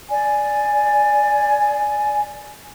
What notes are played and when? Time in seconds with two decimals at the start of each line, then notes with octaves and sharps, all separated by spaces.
0.12 D5 G#5